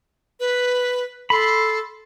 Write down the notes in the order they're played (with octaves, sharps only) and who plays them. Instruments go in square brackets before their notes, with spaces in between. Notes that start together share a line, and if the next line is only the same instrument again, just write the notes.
[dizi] B4
[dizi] A4 [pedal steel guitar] B5 C6